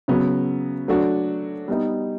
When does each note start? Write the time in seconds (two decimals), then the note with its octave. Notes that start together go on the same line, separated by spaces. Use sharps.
0.08 C#3 F#3 B3
0.88 F#3 A3 D4 F#4
1.68 G3 B3 D#4